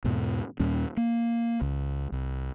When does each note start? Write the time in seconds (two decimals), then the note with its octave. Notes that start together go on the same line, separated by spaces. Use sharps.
0.04 E2 G#2 B2
0.60 D#2 A#2 G3 C#4
0.97 A#3
1.62 C#2
2.12 C2